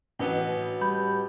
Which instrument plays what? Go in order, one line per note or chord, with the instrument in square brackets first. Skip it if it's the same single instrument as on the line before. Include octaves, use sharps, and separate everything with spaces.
[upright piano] A1 [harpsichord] F#3 B3 D#5
[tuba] G3 [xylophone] B5 G6